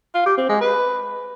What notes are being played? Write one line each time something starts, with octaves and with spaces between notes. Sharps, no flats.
F4
G4
C4
G#3
B4